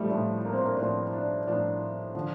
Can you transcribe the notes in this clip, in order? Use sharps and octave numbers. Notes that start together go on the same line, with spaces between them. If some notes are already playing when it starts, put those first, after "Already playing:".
Already playing: A2 F3 G3 A3
A2 F3 A3
A#3
C4
A#3
D4
A2 F3 C4
D4
A2 F3 D4
D3 F3